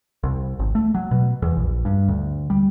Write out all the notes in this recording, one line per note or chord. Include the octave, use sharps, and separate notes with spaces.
C2
G#1
A3
F#3
B2
E2
A#1
G2
D2
G3